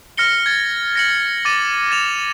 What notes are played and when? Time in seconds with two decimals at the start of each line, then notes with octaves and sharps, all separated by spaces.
0.18 F6 A#6 C#7 G7
0.46 G#6 A6
0.95 A#6 C#7 F#7
1.45 D6 A6 D#7
1.91 A6 E7 F7